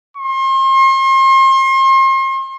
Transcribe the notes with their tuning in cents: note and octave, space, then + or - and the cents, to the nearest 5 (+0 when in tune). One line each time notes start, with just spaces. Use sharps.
C6 +40